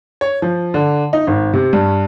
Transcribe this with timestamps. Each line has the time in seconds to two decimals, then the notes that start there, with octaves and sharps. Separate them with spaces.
0.21 C#5
0.42 F3
0.74 D3
1.13 D#4
1.27 G#1
1.53 C3
1.73 G2